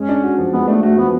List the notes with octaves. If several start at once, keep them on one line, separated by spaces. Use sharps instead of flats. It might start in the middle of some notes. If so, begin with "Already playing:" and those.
Already playing: G#3 C#4
D4
F#4
F3
G#3 B3
A3 D4
A3 F#4
F3 B3